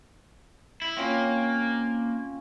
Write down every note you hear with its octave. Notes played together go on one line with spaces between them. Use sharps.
E4
A#3 C4 C#4 F4